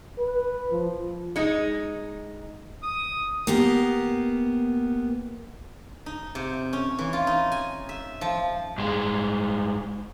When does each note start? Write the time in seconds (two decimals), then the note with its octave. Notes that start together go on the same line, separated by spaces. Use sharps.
0.18 B4
0.71 F3
1.36 G#3 D#4
2.83 D#6
3.47 A#3 B3 G4
6.06 D#4
6.35 C3
6.73 C#4
6.99 E3
7.13 F4
7.27 D#4
7.52 G#5
7.89 E5
8.21 F3
8.78 G2 G#3